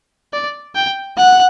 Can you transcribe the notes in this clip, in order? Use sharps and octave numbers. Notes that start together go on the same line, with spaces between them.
D5
G5
F#5